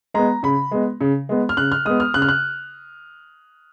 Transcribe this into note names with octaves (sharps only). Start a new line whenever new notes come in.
G#3 B3 A#5
C#3 B5
G#3 B3
C#3
G#3 B3
F6
C#3 F#6
F6
G#3 B3 D#6
F6
C#3 F#6
F6
F#6